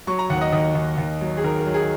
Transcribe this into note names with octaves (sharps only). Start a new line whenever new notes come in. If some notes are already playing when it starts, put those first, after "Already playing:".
F#3 C#6
A#5
D#2 F#5
D#5
D#2 D#5
D#2
D#2
F#3
G#4
D#3 A#4
A#4
F#3
G#4